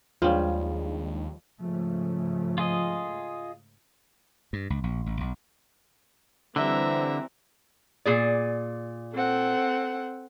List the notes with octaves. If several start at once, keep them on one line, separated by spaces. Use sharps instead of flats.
D#2 F3 G3 G#3 D4 F4 G#4 C#5
G#2 C#3 F3 A3
F4 G#4 D#5
G2
C#2
A#1
A1
B1
D3 E3 G3 C4 E5 A#5
A#2 G#4 D5
C4 A4 F#5